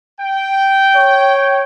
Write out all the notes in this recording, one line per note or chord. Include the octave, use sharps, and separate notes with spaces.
G5
C#5